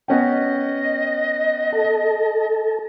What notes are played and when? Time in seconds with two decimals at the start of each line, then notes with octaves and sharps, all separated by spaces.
0.08 B3 C#4 D#5 G5
1.72 A4